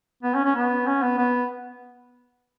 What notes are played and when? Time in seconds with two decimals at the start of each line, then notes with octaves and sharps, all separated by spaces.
0.23 B3
0.35 C#4
0.45 C#4
0.56 B3
0.87 C#4
1.02 B3
1.18 B3